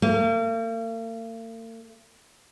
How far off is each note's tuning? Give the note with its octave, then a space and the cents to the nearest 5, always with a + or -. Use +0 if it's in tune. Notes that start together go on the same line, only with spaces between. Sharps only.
A#3 -45